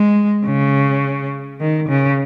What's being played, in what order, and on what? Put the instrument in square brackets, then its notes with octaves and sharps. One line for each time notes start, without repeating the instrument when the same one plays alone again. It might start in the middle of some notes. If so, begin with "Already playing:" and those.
Already playing: [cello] G#3
C#3
D#3
C#3